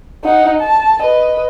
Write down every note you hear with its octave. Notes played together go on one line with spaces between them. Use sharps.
D#4 F#5
A5
B4 D#5